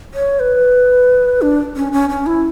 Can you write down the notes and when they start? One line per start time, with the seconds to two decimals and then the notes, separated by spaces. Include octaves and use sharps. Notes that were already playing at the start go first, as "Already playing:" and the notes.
0.14 C#5
0.40 B4
1.42 D4
1.76 C#4
1.92 C#4
2.10 C#4
2.26 E4